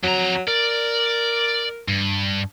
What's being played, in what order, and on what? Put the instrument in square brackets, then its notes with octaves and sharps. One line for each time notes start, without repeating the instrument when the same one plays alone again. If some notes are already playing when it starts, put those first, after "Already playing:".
[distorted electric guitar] F2 A#5 [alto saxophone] F#3
[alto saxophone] A#4 [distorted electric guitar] D5
[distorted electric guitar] G2